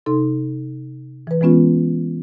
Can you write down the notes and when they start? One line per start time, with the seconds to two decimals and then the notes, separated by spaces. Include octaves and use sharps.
0.06 C3 D#4 A4 C6
1.27 E3 B4
1.41 E3 G#3 B3 C#4 F4